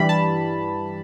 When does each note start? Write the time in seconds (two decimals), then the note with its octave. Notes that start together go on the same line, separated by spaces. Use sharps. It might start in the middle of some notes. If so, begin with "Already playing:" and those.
Already playing: G2 E3 G3 B5
0.09 A5